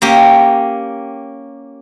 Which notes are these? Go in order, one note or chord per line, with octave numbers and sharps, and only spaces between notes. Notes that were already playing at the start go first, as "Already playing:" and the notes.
A#3 C#4 G4